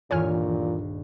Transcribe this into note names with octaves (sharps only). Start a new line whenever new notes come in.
D#1 G2 A#2 E3 F4 C#5 G#5 F6